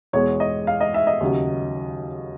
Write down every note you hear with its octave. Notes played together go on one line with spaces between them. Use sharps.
E2 B2 G#3 C#5
D#5
F5
D#5
E5
D#5
D#2 C#3 F#3